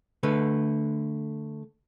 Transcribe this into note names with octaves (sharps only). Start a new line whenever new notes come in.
D3 A3 B4